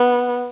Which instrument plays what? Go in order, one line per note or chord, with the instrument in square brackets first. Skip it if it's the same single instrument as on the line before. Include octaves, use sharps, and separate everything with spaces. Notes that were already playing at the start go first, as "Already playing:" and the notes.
Already playing: [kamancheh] B3